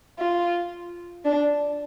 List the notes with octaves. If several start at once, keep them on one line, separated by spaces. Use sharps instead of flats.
F4
D4